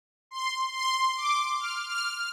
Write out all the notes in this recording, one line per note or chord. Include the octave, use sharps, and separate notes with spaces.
C6
C6
D6
F6
F6